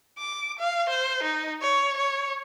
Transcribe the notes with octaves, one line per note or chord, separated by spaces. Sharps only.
D6
F5
C5
D#4
C#5
C#5